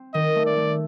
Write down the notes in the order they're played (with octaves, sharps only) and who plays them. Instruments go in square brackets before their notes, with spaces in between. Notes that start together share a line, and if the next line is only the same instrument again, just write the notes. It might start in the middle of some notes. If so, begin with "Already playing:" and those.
Already playing: [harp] C4
[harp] D#3 [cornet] D#5
[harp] A3
[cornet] D5
[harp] A3